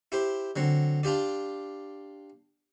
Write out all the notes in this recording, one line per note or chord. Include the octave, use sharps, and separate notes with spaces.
E4 G4 C5
D3 F#3 C4
D4 F4 G4 D5